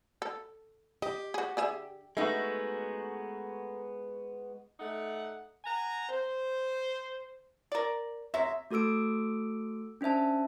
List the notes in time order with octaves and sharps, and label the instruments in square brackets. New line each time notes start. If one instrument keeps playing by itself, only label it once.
[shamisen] A4
[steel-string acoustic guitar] G4 [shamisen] D#5
[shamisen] F#4 G#4
D3 G#4 E5
[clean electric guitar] G#3 B3 F#4 [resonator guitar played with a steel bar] A3 D#4
[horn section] A3 D#4 F#5
F#5 G#5 A#5
C5
[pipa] A#4 D5
[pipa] F#3 G#3 [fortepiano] E5
[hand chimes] A3 F#4 A4 D6 E6 D7
C#4 D4 C5 E5 A5